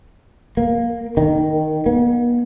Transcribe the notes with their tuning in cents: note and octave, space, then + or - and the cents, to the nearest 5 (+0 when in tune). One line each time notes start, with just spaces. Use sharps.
A#3 +5
D#3 -5
B3 -45